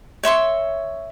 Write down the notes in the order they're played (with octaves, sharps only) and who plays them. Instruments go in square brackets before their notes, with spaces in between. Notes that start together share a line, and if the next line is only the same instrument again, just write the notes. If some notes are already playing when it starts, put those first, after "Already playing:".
[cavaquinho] C#5 E5 C6 C#6